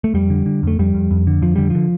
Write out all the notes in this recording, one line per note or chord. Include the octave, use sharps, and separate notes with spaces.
A3
F2 G3
D3
D3
F2 A3
F2 G3
F2
F2
D3
F2 F3
D3 G3
D3 F3